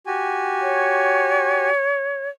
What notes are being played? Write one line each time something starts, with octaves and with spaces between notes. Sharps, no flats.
F#4 G4 G#5
C#5